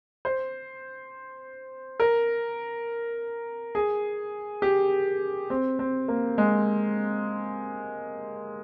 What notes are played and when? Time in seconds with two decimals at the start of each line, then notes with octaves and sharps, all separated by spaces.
0.25 C5
2.00 A#4
3.75 G#4
4.62 G4
5.50 C4
5.79 C4
6.08 A#3
6.38 G#3